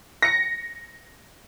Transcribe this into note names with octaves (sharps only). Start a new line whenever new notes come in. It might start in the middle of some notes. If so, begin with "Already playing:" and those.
A#6 C#7